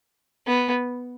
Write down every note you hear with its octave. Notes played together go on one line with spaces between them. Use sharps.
B3